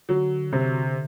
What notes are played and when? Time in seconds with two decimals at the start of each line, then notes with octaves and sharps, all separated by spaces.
0.09 D3 F#3
0.52 C3